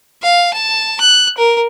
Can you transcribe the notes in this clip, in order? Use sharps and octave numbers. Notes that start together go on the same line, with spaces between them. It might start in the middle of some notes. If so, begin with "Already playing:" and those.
F5
A5
F#6
A#4